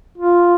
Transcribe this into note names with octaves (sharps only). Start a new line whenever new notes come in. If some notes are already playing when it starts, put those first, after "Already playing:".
F4